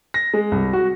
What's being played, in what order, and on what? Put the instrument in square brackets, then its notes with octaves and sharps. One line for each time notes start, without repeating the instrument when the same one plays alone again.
[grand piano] A#6
G#3
C2
F#4